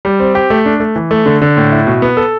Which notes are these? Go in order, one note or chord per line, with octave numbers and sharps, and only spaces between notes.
G3
C4
G4
A3
D4
A3
E3
A3
D3
D3
A2
E4
B2
B3
A4